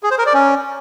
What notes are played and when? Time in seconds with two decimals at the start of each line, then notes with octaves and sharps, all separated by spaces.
0.03 G#4
0.11 C5
0.19 A#4
0.26 D5
0.34 C#4